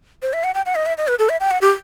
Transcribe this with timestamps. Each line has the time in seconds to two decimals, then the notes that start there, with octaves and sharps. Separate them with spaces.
0.22 C5
0.33 E5
0.44 F#5
0.54 G5
0.66 F#5
0.75 D#5
0.86 E5
0.98 D#5
1.08 B4
1.19 A4
1.29 E5
1.40 G5
1.51 F#5
1.61 G4